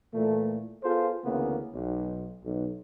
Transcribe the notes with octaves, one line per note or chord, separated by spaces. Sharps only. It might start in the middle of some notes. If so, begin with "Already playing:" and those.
A#2 E3 A3
B3 F4 G#4 A4 C5
D2 C#3 E3 A#3 B3
B1
B1